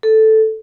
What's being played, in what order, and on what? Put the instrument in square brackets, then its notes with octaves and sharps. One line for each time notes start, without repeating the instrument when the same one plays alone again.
[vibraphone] A4